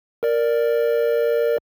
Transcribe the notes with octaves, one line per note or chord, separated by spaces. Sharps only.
A#4 D5